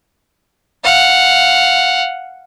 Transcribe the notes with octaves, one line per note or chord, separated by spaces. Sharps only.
F5 F#5